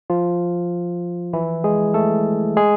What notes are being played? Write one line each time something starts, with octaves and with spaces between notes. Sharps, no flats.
F3 F4
E3 E4
G#3 G#4
A3 A4
G#3 G#4